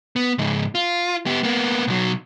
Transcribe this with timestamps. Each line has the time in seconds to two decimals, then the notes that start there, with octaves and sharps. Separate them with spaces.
0.16 B3
0.38 C#2 G#2
0.75 F4
1.26 B3 G4
1.43 A#3 B3
1.87 B1 F#3